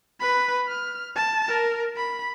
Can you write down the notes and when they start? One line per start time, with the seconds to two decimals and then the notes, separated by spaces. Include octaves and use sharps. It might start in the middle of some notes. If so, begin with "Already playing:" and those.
0.20 B4 B5
0.68 F6
1.16 A5
1.48 A#4
1.97 B5